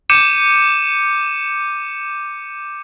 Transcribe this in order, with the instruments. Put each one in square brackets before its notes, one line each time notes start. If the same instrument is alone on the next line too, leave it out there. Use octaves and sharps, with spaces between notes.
[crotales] D6 G6 C#7 D#7 E7